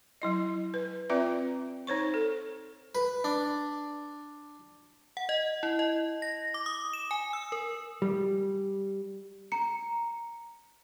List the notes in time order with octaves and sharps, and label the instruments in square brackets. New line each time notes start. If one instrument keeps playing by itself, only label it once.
[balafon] F#3 E4 D#5
B4
C4 F4 B4 D5 E5 A#5
D#4 C5 C#5 C#6
A4
[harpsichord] B4
D4
[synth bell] F#5
D#5
E4
D#5
A#6
D6
D#6
E7
G#5
E6
A#4
[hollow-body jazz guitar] G3
[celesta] A#5 C#7